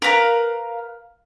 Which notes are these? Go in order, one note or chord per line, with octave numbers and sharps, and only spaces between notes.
A#4 B4 F5 A#5